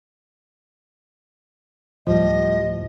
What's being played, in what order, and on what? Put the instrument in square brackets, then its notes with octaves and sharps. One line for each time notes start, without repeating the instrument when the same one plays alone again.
[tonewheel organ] D2 A2 [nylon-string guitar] F3 G3 [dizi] D#5